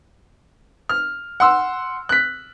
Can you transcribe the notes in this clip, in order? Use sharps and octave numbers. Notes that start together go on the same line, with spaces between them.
F6
F#5 C6 E6
F#6 B6